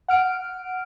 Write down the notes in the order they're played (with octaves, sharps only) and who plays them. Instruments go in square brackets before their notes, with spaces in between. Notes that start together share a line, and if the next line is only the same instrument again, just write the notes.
[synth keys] F#5 F6 D7